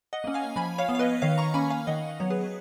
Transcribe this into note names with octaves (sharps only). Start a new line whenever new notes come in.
D#5 F#5
A#3 C#4
F5 G#5
F3 G#5 B5
C#5 F5
B3
F5
B4 D#5
D#3 C#5 F5
A#5 C#6
A#3 C#4 G#5 B5
F5 G#5
D#3 D#5 F#5
F#3 B3 C#5
G#4 B4